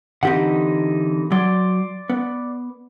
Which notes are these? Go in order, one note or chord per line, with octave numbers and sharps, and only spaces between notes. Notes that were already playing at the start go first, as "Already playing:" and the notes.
D3 E3 C4 D#4 G4 F#5
F#3 D5 C6
B3